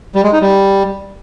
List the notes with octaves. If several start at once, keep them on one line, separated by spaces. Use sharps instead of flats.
G3
G#3
D#4
G3